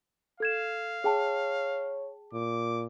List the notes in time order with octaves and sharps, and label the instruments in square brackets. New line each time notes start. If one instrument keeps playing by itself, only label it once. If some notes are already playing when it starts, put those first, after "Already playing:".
[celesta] A4 G#6 E7 [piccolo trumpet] F5
[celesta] G#4 G5 A5 [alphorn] C#5
[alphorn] A#2 [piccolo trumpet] D6